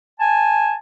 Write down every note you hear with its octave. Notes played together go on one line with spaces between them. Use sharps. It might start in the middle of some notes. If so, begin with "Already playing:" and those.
G#5 A5